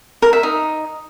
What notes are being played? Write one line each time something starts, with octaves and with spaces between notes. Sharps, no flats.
A#4
E5
D#4